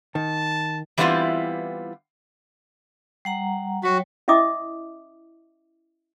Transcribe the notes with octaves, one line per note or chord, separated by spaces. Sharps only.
D#3 A5
E3 G3 B3 C4 E4 F4
G3 F#5 A#5
F#3 F#4 C#5 G5
C#4 E4 D#5 E5 D6 D#6